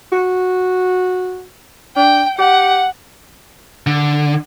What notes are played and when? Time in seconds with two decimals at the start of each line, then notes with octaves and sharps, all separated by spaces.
0.12 F#4
1.96 D4 G5
2.38 G4 F#5
3.87 D3